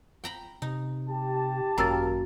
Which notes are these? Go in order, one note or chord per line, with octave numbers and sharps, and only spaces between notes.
G5 A#5 B5
C3 D#4
G4 A5
G#1 F#2 A#3 F5 A#5 E6 A6